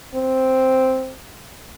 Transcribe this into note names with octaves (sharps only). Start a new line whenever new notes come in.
C4